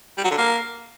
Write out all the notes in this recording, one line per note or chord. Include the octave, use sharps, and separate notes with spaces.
G3
F#3
D3
A#3